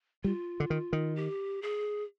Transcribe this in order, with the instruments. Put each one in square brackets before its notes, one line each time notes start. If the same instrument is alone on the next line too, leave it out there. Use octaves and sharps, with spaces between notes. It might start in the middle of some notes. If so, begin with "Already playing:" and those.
[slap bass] G3 [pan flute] F4
[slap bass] D3
D#3
D#3
[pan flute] G4
G#4